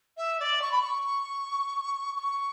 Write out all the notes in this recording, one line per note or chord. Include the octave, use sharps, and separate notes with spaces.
E5
D5
C#6
B5
C#6
C#6